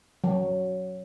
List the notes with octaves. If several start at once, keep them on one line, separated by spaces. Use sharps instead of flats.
F#3